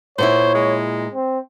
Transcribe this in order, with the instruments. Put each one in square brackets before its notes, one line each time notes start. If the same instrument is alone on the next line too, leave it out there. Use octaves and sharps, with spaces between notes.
[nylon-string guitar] A#2 B3 E4 [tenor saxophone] C5 [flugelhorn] C#5
[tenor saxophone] G#3
[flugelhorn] C4